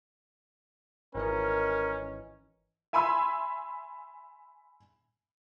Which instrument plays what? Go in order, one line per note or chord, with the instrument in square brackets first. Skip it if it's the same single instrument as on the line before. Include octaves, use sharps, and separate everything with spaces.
[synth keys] G#1 E3 D#5 [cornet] C#4 [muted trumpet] A#4
[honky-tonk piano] E5 G#5 B5 C6 E6